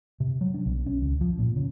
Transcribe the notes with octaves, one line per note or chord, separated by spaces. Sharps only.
C3
F#3
D4
B1
C#4
C#2
F3
A#2
C#3